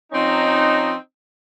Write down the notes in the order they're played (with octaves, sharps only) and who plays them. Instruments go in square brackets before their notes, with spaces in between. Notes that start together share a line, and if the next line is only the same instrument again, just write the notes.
[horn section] F3 C4 C#4 D#4